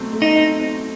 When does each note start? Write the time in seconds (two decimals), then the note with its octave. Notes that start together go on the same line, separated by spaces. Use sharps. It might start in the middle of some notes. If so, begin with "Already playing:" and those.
Already playing: B2 F#3 A3 C4
0.13 A3
0.22 D#4
0.36 C4
0.59 C4